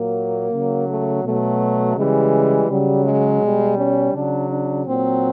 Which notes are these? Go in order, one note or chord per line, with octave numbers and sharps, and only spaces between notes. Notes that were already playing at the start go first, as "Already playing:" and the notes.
Already playing: A#2 F#3 A#3
C#3 F#3
A3
B2 F#3 A3
C#3 E3 G3 G#3
C#3 F#3 G3
G#3
B2 G3
C#4
C#3 F#3 D4
D4
A#2 F#3 C4